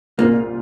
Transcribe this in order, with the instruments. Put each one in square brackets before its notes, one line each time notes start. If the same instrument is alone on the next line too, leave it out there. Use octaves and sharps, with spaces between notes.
[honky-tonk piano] C2 A#2 G#3 C4 F4 [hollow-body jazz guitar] A#3